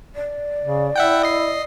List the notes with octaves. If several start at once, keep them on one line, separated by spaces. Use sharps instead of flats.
D5
C#3
E4 E5 F#5 G5
D#5 C7